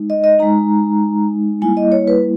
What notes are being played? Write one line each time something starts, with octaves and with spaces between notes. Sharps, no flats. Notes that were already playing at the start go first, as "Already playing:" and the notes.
Already playing: G#3 D#4
D#5
D#5
G#3 D#4 A#5
G3 A#3 E4 G#5
D#5
C#5
B4